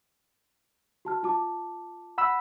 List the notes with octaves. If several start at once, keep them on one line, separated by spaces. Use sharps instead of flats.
F#4 A5 F6
F4 A5 D6
F#5 B5 E6